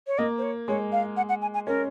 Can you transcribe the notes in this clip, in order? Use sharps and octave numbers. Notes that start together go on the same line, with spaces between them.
C#5
A#3 D#5
C5
C#5
G#3 C#5
F5
F#5
F#5
G#5
G#5
C#4 A#4